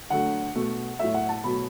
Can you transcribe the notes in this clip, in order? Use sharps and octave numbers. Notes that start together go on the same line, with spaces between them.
D3 F#3 A3 F#5
B2 A3
A2 F#3 A3 E5
F#5
A5
B2 F#3 A3 B5